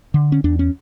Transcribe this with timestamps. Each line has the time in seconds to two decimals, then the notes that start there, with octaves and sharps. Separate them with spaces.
0.14 D3
0.32 C#4
0.44 E2 D4
0.59 C#4